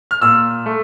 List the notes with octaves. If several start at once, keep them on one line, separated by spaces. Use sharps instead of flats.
F6
A#2 E6
A3